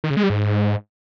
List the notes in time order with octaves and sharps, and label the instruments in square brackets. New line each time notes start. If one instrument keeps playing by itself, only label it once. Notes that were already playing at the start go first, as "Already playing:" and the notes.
[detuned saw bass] D#3
C#3
G#3
G3
G#2